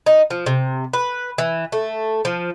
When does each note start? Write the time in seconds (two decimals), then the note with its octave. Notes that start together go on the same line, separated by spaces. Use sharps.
0.06 D#4
0.30 F3
0.46 C3
0.93 B4
1.38 E3
1.72 A3
2.25 F3